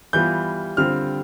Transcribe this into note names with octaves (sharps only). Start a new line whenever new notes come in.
E3 G3 B3 F4 G6
D3 G3 C4 F4 F6